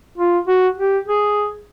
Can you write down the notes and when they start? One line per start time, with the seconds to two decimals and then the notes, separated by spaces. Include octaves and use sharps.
0.18 F4
0.47 F#4
0.78 G4
1.08 G#4